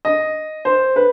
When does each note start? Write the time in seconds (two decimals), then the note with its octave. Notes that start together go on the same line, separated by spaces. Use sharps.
0.05 D#5
0.65 C5
0.96 B4